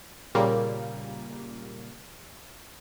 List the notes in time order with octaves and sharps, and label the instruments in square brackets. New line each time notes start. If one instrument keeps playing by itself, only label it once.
[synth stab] A#2 C#3 G3 A#3